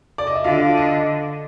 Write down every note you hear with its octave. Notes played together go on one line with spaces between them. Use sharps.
D5
D#5
E5
D3 F4 F5
D#5